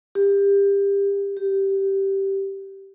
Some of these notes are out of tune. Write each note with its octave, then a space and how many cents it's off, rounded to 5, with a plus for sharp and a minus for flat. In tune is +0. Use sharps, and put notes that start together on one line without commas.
G4 +25
G4 -10